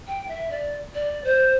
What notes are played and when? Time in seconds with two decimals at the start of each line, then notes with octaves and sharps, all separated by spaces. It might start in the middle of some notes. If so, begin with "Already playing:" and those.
0.08 G5
0.28 E5
0.50 D5
0.95 D5
1.24 C5